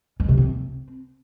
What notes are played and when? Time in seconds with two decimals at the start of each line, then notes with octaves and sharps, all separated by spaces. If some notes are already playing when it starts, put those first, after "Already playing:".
0.20 G#3
0.29 C3
0.38 C4